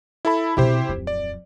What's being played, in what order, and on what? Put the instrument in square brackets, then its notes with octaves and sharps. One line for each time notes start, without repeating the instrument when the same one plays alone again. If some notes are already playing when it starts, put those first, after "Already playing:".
[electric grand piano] E4 A4 B5
[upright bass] B2 C4 [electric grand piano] E4 G4 C5
[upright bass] D1 F2
[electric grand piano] D5